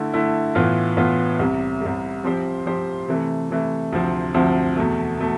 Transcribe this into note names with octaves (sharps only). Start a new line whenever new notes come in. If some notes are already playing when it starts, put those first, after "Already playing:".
Already playing: D3 A3 E4
D3 A3 E4
A2 E3 B3 F4
A2 E3 B3 F4
C2 C3 G3
C2 C3 G3
F3 C4 G4 C5
F3 C4 G4 C5
C3 E3 A3
C3 E3 A3
D2 C3 F3 C4
D2 C3 F3 C4
E2 B2 A3
B2 A3